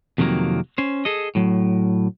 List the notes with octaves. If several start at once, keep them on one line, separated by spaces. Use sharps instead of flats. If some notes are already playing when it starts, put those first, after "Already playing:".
F2 C3 D#3 F#3 A#3
C#4 C5
G#4 A4 D#5
A2 F#3